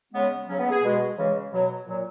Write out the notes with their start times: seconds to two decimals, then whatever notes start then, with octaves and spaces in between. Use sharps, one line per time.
0.13 C#3 G#3 B3
0.48 C#3 F#3 C#4
0.59 B3
0.71 G#4
0.83 B2 G#3
1.17 C#3 E3 G#3
1.52 B2 F#3
1.87 A#2 F#3